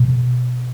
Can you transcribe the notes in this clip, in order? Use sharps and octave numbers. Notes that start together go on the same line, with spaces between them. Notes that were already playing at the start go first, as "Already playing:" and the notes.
Already playing: B2